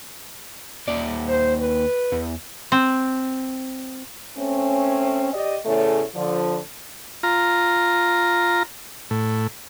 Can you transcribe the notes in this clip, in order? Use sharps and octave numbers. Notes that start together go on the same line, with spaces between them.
D#2 D5
C5
B4
E2
C4
A3 C4 C#4
G4 D5 D#5
E2 A2 C#3 A3
D3 F3
F4 A#5
A2